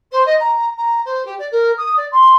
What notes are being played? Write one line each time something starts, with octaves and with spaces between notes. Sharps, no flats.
C5
D#5
A#5
A#5
C5
G4
D5
A#4
D#6
D5
C6